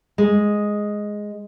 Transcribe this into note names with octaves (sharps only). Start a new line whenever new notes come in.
G#3